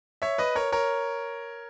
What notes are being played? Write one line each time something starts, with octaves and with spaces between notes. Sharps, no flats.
C#5 E5
B4 D#5
A#4 C#5
A#4 C#5